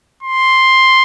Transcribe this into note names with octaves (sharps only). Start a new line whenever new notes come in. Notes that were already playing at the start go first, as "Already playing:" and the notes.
C6